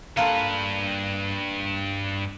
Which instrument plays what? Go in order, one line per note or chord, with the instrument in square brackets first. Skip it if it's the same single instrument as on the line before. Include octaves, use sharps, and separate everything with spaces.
[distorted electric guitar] G2 B4 [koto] A#3 F4 A4